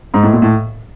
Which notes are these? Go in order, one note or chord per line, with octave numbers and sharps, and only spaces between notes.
G#2
A2
A#2
A2